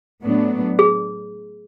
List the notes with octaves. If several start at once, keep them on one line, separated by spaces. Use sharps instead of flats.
A2 F#3 B3 D4
G#4